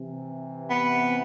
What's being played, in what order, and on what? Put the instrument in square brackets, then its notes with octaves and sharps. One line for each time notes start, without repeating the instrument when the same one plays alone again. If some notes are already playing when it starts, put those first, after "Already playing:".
Already playing: [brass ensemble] C3 E3
[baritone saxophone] B3